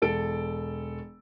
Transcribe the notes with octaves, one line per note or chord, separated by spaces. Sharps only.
E1 A4 D7